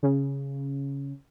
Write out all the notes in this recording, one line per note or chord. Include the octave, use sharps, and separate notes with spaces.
C#3